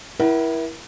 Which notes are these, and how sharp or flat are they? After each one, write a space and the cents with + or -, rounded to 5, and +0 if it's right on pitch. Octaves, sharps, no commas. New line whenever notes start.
E4 +0 A#4 +40 F#5 +40